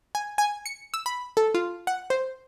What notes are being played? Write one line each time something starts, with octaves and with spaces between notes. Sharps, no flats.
G#5
G#5
C#7
E6
B5
A4
F4
F#5
C5